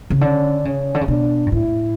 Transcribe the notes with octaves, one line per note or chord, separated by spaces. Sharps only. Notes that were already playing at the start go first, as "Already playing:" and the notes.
C#3
D3 C#4
C#3 C#4
D3
C#3
B2 D4
G2
A2 E4